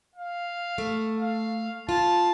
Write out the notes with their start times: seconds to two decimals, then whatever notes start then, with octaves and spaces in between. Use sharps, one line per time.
0.15 F5
0.78 A3
1.19 F5
1.89 F4 A5